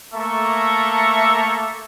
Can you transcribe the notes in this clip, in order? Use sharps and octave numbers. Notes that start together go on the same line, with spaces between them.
A3 A#3 A4 E5 A#5 C#6